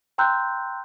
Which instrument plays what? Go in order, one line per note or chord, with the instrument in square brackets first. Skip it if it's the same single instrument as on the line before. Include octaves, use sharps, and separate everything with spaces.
[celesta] G5 A#5 C6 E6 F#6 G6